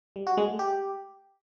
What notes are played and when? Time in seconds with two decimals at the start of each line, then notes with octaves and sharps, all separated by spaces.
0.16 G3
0.27 F#4
0.37 G#3
0.48 A3
0.59 G4